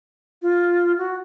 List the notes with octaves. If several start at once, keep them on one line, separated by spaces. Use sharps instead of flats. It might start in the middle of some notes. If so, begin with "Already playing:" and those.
F4
F#4